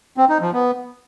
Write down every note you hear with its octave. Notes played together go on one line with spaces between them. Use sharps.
C4
D#4
F3
B3